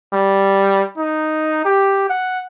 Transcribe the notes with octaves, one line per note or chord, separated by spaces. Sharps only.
G3
D#4
G4
F#5